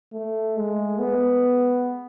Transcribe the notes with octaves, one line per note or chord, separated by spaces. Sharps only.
A3
G#3
B3